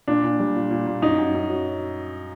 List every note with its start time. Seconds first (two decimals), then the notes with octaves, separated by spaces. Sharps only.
0.08 A#2 D4
0.24 A#2
0.40 G3
0.56 A#2
0.71 A#2
0.87 A#2
1.02 F#2 D#4
1.18 F#2
1.34 F#2
1.50 F#3